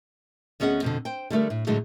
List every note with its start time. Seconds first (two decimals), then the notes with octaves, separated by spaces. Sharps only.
0.60 D2 B3 C#4 G#4 D#5 F#5
0.82 F2 B2 D3
1.05 C5 G5
1.30 D3 G3 A3 A#4
1.50 A2
1.67 A2 D3 F#3 G#3 A3